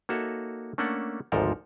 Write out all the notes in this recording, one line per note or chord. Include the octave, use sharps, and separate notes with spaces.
A#3 D#4 F#4 A4 C#5 E5
A3 A#3 C#4 D4 A4 F#5
G#1 D2 G#2 F3 A4 A#4